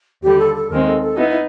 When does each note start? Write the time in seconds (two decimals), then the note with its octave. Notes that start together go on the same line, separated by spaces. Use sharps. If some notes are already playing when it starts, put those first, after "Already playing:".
0.23 D#2 D3 G3 G4
0.39 A4
0.55 A4
0.70 D#2 D#3 G#3 C4 A#4
0.86 A4
1.02 A4
1.17 B3 D#4 E4
1.29 E4